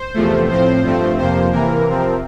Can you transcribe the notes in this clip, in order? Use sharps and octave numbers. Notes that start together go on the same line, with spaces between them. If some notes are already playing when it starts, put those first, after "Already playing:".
Already playing: C5
E2 C3 F3 A3
A2 F3 C4 C5
G2 F3 A3 C4
F2 C3 F3 A#3 C5
C3 E3 A#3 A#4
C3 F3 C4